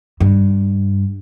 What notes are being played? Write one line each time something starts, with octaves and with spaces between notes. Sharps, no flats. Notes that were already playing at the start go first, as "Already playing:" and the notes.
G2